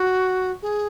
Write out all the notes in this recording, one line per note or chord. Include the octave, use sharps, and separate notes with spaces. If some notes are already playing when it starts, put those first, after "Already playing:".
Already playing: F#4
G#4